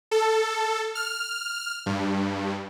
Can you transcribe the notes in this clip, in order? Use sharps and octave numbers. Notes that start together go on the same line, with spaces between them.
A4
F6
G2